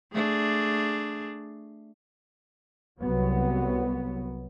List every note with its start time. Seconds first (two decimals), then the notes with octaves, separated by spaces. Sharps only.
0.14 A3 D4 G#4
3.00 C2 F#3 B3